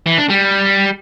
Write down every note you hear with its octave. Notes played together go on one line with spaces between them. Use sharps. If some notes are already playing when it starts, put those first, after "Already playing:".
E3
D4
G3